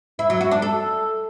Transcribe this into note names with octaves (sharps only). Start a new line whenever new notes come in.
E4
F#3
F#4
D4
A4